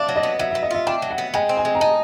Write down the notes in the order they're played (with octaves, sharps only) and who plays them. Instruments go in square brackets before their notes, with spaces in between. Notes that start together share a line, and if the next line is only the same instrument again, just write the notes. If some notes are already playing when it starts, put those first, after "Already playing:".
Already playing: [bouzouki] D4 [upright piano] D5 E5 F5
[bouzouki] F#3
[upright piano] D#5
[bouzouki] B3
[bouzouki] F#3 [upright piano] E5
[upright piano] E5
[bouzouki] B3
[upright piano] D#5
[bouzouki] F4 [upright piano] E5
[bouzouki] D4 [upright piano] G5
[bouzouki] F#3
[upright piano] F#5
[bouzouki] B3
[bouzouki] G#3 [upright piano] G5
[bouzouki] C4
[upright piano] G#5
[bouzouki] G#3
[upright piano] A#5
[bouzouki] D#4 [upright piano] A5